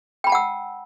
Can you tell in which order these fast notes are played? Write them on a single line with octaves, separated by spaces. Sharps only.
G5 B5 A5 F#5 E6